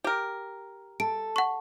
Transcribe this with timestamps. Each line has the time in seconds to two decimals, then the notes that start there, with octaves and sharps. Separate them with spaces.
0.04 G4 A#4
1.00 A4 D7
1.36 F#5 C#6